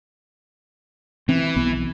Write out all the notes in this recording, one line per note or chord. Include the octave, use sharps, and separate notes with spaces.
E3 C4
B1 B3